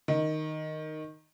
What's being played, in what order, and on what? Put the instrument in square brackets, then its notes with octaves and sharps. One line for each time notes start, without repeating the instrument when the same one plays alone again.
[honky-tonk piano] D#3